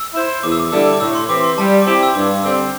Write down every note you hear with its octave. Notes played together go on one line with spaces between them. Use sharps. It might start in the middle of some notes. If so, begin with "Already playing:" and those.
Already playing: E6
E4 C5
E2 D6
E6
D6
D3 G3 E4 A4 E6
D6
A2 E6
C6
E3 C4 G4 D6
C6
G3 A5
D6
C4 E4 G4 C6
E6
G2 D6
D3 G3 C4 E6